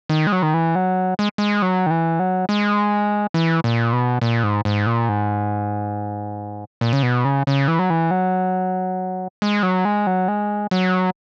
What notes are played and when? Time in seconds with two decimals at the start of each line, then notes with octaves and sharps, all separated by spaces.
0.09 D#3
0.27 G#3
0.32 F#3
0.43 D#3
0.54 E3
0.75 F#3
1.19 G#3
1.38 G#3
1.62 F#3
1.86 D#3
1.90 E3
2.19 F#3
2.49 G#3
3.34 E3
3.64 A#2
3.93 B2
4.21 A#2
4.43 G#2
4.65 G#2
4.86 A#2
5.09 G#2
6.81 A#2
6.93 C#3
7.03 B2
7.25 C#3
7.47 C#3
7.68 E3
7.79 F#3
7.90 E3
8.11 F#3
9.42 G#3
9.63 F#3
9.85 G#3
10.07 F#3
10.28 G#3
10.71 F#3